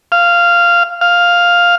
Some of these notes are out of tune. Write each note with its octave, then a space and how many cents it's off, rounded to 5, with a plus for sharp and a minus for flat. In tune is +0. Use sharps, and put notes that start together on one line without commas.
F5 -10
F5 +5